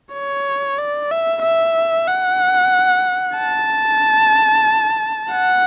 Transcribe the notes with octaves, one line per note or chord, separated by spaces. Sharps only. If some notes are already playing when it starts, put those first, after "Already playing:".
C#5
D5
E5
E5
F#5
A5
F#5